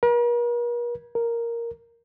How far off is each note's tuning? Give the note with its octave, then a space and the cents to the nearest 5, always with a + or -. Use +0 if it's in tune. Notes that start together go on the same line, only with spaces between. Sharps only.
A#4 +45
A#4 +0